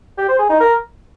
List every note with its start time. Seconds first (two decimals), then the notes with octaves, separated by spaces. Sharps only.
0.18 G4
0.28 C5
0.39 G#4
0.49 D#4
0.60 A#4